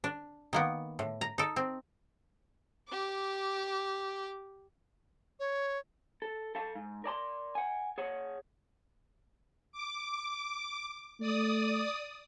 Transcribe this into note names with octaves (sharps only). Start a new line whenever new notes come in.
D4
D#3 A#3 B3
A2
A#5
D#4 A4
C4
G4 D6
C#5
A4
A4 F5 A5
G#2
A#4 D5 A5 C6
F#5 G#5
G#4 C#5 F#5
D6
A3 D5 D#6